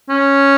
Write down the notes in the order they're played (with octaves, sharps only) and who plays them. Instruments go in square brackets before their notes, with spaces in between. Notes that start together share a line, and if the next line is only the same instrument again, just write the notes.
[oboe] C#4